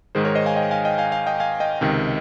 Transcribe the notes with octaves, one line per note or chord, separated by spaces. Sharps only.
G#2 D#3 G#3 G#4 C5
A#4 C#5
C5 D#5
F5 G#5
D#5 G5
F5 G#5
D#5 G5
F5 G#5
F5 G#5
D#5 G5
F5 G#5
D#5 G5
C#2 C3 D#3